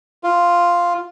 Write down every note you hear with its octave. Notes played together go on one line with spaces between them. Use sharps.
F4